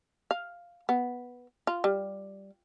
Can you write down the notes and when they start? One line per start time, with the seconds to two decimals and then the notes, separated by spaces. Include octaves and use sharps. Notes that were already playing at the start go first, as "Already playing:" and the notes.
0.31 F5
0.89 B3
1.67 F4
1.84 G3